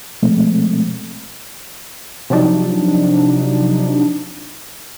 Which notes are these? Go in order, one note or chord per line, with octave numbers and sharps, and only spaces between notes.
B2 F3 G#3 A3 C4
C3 F3 F#3 D4 D#4